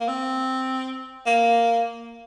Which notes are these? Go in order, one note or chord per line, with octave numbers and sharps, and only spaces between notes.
A#3
C4
A#3